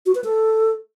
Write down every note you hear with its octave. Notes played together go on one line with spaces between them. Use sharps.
F#4
B4
A4